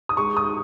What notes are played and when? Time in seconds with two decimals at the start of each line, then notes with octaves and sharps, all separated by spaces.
0.09 D#6
0.17 G#3 C#6
0.37 D#6